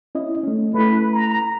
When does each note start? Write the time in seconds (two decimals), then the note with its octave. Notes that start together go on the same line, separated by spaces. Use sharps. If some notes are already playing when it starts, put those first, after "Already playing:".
0.15 C#4 E4 D#5
0.43 A3 C#4
0.74 A3 E4 B4
1.12 A#5